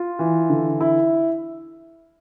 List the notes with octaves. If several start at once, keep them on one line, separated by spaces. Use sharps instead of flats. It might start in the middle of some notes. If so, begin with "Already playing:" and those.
Already playing: F4
E3
D3
E4